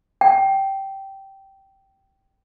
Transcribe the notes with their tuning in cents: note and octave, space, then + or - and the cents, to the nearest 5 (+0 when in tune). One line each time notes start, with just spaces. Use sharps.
G5 -10